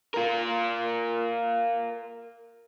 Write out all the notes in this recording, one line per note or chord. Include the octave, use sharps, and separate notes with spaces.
F4 A#4